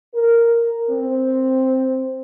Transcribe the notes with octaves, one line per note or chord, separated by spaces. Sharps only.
A#4
C4